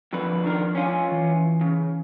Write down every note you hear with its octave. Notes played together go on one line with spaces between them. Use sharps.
F2 D3 F3 B4
D#3 D4 A#4
C#4 F4 G#5
E3
C#3